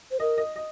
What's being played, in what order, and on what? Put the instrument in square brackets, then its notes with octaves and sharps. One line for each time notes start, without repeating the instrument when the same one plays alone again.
[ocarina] C5
[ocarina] A#4 [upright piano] D#5
[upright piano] D#5
D#5